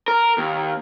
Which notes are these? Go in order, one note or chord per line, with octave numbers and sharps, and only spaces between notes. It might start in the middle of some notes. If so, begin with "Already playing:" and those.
A#4
D#2